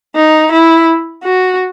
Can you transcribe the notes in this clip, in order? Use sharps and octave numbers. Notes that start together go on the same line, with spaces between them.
D#4
E4
F#4